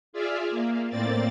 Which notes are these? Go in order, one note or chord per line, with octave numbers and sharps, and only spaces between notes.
F4 G#4 D5 E5 F5
A#3
A2 A#3 C4 D5 A6